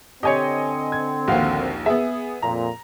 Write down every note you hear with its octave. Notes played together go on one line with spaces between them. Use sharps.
D3 C4 G4 C#5 D#5 G#5 C#7
G#6
A#1 D#2 F#4 F5
B3 G#4 E5
F2 A#2 A#5